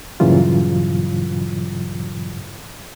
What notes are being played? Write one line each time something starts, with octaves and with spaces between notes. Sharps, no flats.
G2 A#2 C#3 E3 F#3 F4